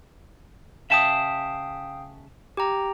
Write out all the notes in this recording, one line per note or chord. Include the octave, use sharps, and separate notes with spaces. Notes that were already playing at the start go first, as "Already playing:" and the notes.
C#3 E5 F5 G5 A5 D#6
G4 G5 A#5